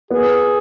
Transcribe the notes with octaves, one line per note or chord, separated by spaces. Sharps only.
B3 G#4